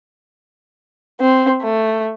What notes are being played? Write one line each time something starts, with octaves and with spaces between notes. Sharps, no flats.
C4
A3